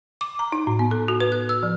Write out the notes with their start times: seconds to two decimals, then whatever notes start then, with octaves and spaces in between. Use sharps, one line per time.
0.21 D6
0.39 A#5
0.52 D#4
0.67 A2
0.79 B3
0.91 A4
1.08 F#4
1.20 B4
1.32 F#6
1.49 E6
1.63 F3